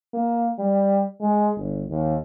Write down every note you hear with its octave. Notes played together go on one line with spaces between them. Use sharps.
A#3
G3
G#3
G1
D#2